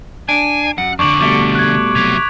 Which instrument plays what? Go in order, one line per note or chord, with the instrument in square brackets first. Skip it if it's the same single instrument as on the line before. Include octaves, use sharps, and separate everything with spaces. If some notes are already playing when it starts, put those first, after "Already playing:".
[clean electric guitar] D4 [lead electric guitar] G#5
[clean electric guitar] F#2 [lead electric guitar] F#5
[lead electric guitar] F2 D3 [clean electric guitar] D4 [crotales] C#6 D6 F#7
[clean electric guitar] B2 G3 A3 [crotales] D6 D7
[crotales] F#6 G#6
[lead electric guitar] C3 F#3 [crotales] G#6 B6 F7